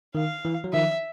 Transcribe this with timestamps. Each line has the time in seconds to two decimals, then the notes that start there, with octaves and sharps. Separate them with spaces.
0.15 D#3 F5
0.45 E3
0.64 F#3
0.73 D#3 F3 E5